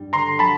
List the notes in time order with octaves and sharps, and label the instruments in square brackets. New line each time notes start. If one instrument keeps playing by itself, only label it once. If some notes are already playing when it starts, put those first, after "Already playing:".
Already playing: [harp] G2 G3
[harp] D3 [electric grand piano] A#5 C6
[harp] F#3 [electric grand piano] A5 B5